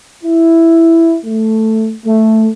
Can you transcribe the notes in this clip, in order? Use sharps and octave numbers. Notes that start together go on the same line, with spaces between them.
E4
A3
A3